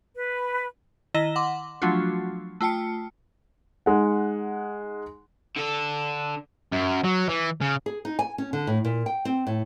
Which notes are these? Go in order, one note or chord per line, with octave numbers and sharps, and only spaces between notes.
B4
D#3 E4 D#5 A#6 E7 G7
F#5 C6 D6
F3 F#3 A3 D4 F4 F#4
A3 F4 G5 A5 C#7
G#3 D#4 F#5
D3 A4
F#2
F#3
E3
C#3
G#4
D#4
G#5
C#4
D3
A2
A#2
G5
C4
A2